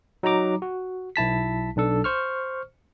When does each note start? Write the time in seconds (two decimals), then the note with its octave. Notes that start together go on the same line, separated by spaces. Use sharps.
0.23 F#3 D#4 F#4 A#5 D6
0.62 F#4
1.16 B1 E4 A5 B6
1.77 B1 D4 A4
2.04 C5 C#6 F6